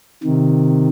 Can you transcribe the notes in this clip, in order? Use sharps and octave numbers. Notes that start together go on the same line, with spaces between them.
C3 D#3